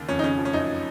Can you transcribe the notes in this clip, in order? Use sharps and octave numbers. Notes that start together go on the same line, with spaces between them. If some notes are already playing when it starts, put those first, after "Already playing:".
Already playing: D#2 C#3
F2 C#4
D#4
C#3 C#4
F3
C#4
F#2 D#4